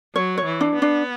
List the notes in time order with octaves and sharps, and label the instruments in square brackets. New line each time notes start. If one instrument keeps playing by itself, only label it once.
[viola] F#3 [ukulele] C#5
[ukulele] C#5
[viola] E3
[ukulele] D4
[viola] B3
[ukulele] D4